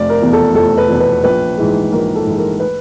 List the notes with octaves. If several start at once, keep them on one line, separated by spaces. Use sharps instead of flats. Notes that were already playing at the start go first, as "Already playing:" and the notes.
Already playing: F1 D5
A#4
E2 B2
A4
F1 A4
B4
E2 B2
B4
A#1 B4
G#2 E3 G#3
A#1 A#4
A4
G#2 E3 G#3
A#4
B4